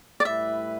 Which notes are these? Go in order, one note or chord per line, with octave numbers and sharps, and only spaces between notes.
D5
A2 G3 E4 B4 E5